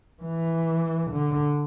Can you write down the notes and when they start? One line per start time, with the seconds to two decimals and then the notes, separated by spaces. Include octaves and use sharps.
0.23 E3
1.12 D3